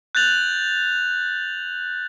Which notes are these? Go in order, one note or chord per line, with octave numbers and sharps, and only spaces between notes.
F#6 G6 A6 F7 F#7